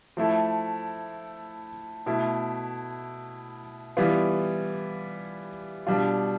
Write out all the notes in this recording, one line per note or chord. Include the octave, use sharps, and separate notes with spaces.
F3 A3 E4 A4
B2 A3 E4
E3 G3 B3 F4
B2 G3 D4 F4